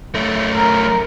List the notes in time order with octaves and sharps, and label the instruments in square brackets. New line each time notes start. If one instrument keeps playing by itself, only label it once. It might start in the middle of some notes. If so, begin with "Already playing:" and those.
[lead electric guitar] F#2 A3
[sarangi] A#4